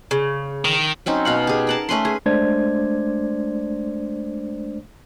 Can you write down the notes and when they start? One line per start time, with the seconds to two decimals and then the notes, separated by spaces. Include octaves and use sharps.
0.11 C#3
0.65 D#3
1.06 F#3 C4 C#4 D#4
1.25 B2 F5 F#5
1.47 G4 G#4
1.67 A#4 F#5 A5
1.89 A3 C#4 B4 C6
2.05 G#4
2.26 G#3 A3 D4 C5 D5 G#6